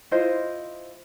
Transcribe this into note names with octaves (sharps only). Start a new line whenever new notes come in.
E4 F4 C5 D#5